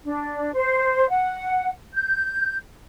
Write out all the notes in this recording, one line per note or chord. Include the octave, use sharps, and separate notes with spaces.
D4
C5
F#5
G6